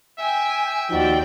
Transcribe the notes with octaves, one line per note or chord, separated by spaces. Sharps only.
E5 G5 G#5
D#2 F3 D#4 F#4 D5 G5